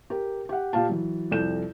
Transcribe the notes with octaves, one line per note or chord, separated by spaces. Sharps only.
G4 A#4
G4 F#5
A#2 G4 F5 A5
E3 F#3
C2 F2 A4 G6 E7